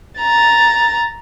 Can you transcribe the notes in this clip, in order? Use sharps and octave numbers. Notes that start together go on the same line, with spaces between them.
A#5 A6